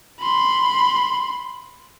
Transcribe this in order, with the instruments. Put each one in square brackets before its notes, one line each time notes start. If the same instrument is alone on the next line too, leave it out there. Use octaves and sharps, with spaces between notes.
[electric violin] B5 C6